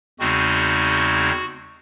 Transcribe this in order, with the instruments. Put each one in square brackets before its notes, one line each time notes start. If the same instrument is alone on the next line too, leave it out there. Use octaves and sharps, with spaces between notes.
[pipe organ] E2 C#3 G#3 C4 D#4 F#4